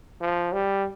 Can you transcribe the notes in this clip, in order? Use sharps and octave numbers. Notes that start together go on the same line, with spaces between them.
F3
G3